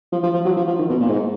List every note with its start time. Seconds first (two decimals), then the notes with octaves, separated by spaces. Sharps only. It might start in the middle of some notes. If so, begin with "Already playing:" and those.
0.12 F3
0.23 F3
0.34 F3
0.45 F#3
0.57 F3
0.68 F3
0.79 D#3
0.89 B2
1.00 A#2
1.09 G#2